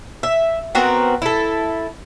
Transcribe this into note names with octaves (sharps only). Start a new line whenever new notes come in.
E5
B3 C4 F#4 A#4
E4 A4